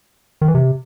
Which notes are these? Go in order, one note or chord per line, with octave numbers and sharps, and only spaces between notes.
D#3
E3
C3